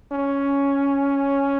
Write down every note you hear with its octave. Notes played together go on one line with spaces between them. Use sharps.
C#4